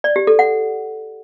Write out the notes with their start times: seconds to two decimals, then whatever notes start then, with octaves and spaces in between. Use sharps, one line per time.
0.04 D5
0.16 G4
0.27 A4
0.39 F#5